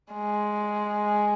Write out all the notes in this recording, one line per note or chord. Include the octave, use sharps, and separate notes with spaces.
G#3